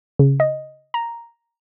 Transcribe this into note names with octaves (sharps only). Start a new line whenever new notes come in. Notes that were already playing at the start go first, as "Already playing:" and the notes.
C#3
D#5
A#5